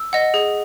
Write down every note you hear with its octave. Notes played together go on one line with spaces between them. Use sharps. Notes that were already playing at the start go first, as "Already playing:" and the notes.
Already playing: E6
D#5 F#5
G#4